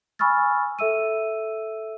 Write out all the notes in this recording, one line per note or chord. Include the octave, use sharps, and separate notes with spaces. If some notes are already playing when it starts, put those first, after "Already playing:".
G#5 B5 C#6 E6 F6 A6
A4 E5 E6 D#7